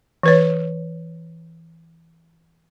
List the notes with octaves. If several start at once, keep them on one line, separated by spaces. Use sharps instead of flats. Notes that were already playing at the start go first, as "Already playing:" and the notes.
E3 B4 C#5